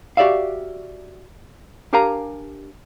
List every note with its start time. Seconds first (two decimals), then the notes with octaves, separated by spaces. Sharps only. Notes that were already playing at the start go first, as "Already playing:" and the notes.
0.17 F#4 G4 D5 E5 F5
1.93 D4 G4 A#4 F5 G#5 A#5